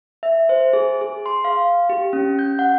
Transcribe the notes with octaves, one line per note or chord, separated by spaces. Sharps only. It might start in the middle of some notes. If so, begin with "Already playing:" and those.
E5
C5
G#4
G#4
C6
F5
G4
C#4
G6
F#5